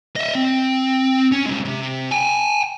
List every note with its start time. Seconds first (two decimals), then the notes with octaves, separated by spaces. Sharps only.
0.16 D#5 E5
0.35 C4
1.32 C#4
1.46 C2 G#3
1.65 C3
2.11 G5 G#5